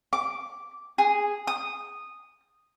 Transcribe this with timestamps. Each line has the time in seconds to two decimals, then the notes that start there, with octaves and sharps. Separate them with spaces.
0.13 D6
0.98 G#4
1.47 D#6